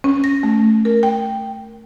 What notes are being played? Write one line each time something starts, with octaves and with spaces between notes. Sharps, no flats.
C#4
A#6
A3
A#4
G5